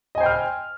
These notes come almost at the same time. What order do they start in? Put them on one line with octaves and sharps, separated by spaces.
D#5 G#5 C5 G5 F6